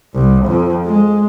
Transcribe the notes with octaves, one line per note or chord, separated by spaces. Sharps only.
C2
F2
G#3